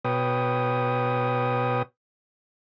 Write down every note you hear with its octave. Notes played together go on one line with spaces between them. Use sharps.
B2 B4 C#5 G5 D#6